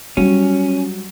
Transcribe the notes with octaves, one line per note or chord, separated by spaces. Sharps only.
F#3 G3 C#4